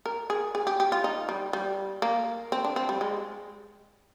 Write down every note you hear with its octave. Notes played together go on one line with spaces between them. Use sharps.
A#4
G#4
G#4
G4
G4
F4
D#4
G3
G3
A#3
C4
D4
C4
G3
G#3